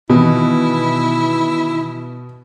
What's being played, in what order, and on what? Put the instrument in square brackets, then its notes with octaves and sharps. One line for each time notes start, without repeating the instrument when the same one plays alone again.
[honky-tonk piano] B2 [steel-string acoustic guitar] D#3 E3 [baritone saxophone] E4